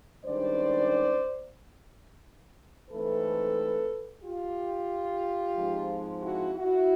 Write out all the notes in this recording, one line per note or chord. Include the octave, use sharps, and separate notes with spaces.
G2 D#3 G#3 C#4 C5 D5
G#2 E3 A3 C4 A4 B4
F4 G4
G#2 F3 G#3 C4
E4 F#4
E4 F#4